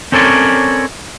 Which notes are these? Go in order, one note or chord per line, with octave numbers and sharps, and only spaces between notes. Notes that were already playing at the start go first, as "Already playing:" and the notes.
C4 C#4 A4 A#4 C#5 D5